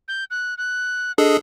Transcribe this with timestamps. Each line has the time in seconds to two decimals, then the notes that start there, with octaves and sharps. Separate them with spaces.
0.08 G6
0.31 F#6
0.58 F#6
1.18 D4 G#4 A4 D#5